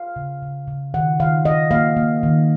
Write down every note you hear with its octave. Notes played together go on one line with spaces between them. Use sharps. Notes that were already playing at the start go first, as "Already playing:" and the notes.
Already playing: F5
C#3
C#3
C#3
D#3 F#5
D#3 F5
D#3 D#5
A#3 F5
A#3
D#3